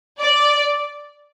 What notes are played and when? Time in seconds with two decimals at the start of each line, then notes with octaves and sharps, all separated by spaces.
0.19 D5